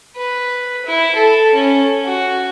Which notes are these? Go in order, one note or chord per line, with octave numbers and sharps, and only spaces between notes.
B4
E4
A4
C#4
F#4